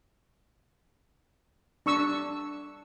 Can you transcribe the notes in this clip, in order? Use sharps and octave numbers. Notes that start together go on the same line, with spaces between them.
D4 C#6 E6